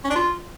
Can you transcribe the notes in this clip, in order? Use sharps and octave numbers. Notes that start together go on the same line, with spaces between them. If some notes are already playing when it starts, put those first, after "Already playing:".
C#4
D4
F4